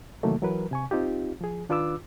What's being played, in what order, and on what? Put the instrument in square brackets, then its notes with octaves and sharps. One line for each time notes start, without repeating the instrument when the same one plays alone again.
[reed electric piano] C3 D#3 E3 F#3 A3 A#3
E3 F#3 A#4 B4
C3 G#5 C#6
C4 D#4 F4 G4
F3 G#4
D#3 D4 F4 B4 D6 E6